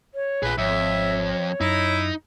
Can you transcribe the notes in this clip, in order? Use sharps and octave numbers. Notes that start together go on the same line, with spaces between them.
C#5
A#1 F4 G#4 B4
G#1 F2 C#5 E5
F#2 D#4 E4